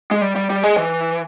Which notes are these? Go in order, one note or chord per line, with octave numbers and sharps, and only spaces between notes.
G#3
G3
G3
G3
G#3
E3